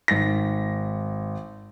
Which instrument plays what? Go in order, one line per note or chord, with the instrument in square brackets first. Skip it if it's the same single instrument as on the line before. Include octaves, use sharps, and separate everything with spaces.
[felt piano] G#1 A#6